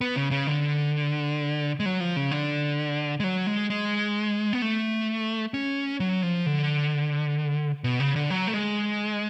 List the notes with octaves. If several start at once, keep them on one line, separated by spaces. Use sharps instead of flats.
B3
C#3
C#3
D3
G#3
F#3
F3
C#3
D3
G#3
F#3
G#3
G#3
B3
A3
C#4
F#3
F3
D3
B2
C#3
D3
F#3
A3
G#3